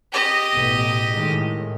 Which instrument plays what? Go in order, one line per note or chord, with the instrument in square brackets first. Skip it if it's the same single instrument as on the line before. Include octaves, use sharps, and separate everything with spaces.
[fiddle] G4 D#5
[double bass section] A1 B2
A2 D#3 G#3